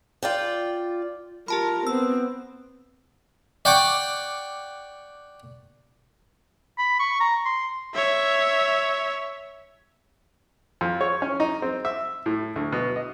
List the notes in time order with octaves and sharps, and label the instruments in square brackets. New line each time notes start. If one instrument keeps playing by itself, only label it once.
[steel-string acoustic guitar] F4 D5 G5
[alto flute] F4 [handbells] G4 A5 B5 [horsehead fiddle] A#4
[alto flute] B3 [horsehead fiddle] C4 [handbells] E6
[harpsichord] D5 F#5 G5 C#6 D6
[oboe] B5
C#6
A#5
C6
[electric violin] C#5 E5
[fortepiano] F2
C#5
C#4
D#4
C4
E5
A2
D2
B2
D#5